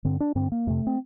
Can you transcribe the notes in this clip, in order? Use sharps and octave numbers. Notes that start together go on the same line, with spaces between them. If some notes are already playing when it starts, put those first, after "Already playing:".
G2 D3 C4
D4
G2 D3 C4
A#3
F2 C3 A3
C4